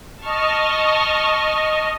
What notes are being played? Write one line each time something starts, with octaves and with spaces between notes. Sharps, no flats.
D#5 A5 C#6 F6